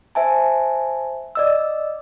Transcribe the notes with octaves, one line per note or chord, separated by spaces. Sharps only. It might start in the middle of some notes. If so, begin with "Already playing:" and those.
C5 E5 G#5 A5
D5 D#5 E6